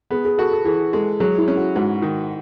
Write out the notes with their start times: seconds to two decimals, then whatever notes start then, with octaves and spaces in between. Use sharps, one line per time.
0.10 B3 G#4
0.25 G#4
0.38 F#4 A4
0.51 A4
0.65 E3 G#4
0.93 G#3 A4
1.20 F#3 G#4
1.38 E4
1.48 C#4
1.56 F#4
1.75 G#2 F#4
2.02 D#3